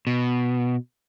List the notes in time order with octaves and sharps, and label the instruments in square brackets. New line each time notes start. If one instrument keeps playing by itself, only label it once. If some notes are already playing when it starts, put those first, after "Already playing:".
[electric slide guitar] B2